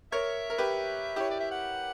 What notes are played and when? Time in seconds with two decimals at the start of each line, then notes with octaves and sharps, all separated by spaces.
0.12 A#4 C#5 E5
0.50 A#4
0.58 G4 B4
1.16 E4 G4 C#5
1.31 D5
1.40 E5
1.51 F#5